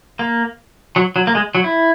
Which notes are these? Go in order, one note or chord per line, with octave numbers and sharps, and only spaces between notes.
A#3
F#3
F#3
A#3
G#3
F#3
E4